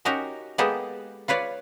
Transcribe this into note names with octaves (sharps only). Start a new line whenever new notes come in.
C#4 D#4 F#4 G4 A#4
G#3 A#3 B3 G4 A4 D#5
F4 B4 C#5 D5